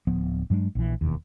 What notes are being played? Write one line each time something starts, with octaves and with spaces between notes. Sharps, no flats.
D1 F3 B3
G2 F#3 G#3 D4
A#1 E3
E1 D#2